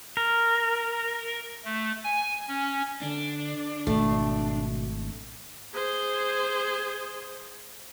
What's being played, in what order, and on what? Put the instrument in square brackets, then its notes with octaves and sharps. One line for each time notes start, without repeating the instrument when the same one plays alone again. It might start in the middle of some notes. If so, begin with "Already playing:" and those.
[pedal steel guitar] A#4
[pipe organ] A3
G#5
C#4
[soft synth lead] D3 [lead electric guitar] D4
[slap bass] G#1 [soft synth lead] B2 [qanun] A3
[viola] G#4 C5